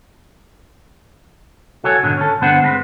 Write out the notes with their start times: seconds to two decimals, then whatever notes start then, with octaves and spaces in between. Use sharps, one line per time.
1.84 C2 F#4 A4 C#5 G#5
2.03 G#2 B2 D3 D#3
2.17 C#4 A4
2.41 G2 D3 B3 D4 C5 F#5
2.63 G#3 C4 B4